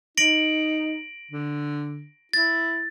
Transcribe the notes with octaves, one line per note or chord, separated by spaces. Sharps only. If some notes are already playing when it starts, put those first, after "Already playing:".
D#4 A#6 D7 F#7
D3
E4 A6